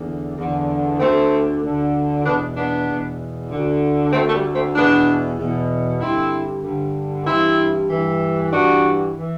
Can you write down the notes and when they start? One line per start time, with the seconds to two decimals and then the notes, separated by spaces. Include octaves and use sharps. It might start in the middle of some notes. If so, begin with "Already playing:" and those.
Already playing: E2 D3
0.37 E2 D3
1.00 D2 D3 A3 C4
1.63 D2 D3
2.25 E2 B2 B3 D4
2.56 B3 D4
2.88 E2 B2
3.51 D2 D3
4.13 D2 D3 A3 C4
4.28 A3
4.34 G3
4.55 A3 C4
4.76 E2 B2 B3 D4
5.38 E2 B2
6.01 G2 D3 C4 E4
6.64 G2 D3
7.26 G2 E3 C4 E4
7.90 G2 E3
8.52 G2 E3 D4 F#4
9.18 E3